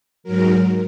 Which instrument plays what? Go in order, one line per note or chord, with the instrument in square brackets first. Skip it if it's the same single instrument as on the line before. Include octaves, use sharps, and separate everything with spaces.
[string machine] G#2 F#3 A#4